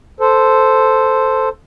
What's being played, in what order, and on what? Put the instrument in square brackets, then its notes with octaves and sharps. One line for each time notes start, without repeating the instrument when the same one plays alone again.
[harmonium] A4 C5